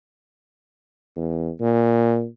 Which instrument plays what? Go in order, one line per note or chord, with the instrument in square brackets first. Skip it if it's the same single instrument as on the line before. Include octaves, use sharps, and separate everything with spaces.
[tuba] E2
A#2